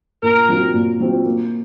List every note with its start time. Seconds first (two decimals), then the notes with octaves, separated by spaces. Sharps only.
0.23 A#2 A#4
0.49 F#3 C4 F4
0.74 A#2
1.00 F#3 C4 F4
1.25 A#3